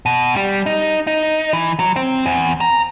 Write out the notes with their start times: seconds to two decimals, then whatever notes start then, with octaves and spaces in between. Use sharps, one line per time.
0.06 B2
0.36 G3
0.66 D#4
1.07 D#4
1.53 E3
1.79 F#3
1.96 C4
2.26 E2
2.61 A#5